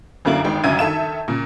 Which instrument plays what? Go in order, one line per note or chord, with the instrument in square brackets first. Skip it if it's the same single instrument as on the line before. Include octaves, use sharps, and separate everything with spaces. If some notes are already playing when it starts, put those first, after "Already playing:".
[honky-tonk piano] G1 F#2 D3 A#3 E4 F#7
G1 D#3 G#3 G5
G1 C#2 F#2 E5 G#6 D#7
D#3 A4 E5 E7
A#2 C#3